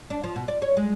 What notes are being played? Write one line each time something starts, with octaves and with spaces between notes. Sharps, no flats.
D4
F3
B2
D5
C#5
G#3